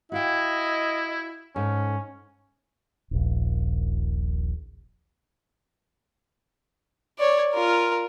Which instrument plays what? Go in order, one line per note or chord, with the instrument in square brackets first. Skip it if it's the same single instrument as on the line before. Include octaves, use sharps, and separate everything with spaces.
[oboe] E4 [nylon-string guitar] F#4 F5 G5 [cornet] D#5
[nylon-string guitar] G#2 A4 [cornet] C#4
[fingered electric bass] D#1 A#1
[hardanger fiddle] C#5 D5
F4 A#4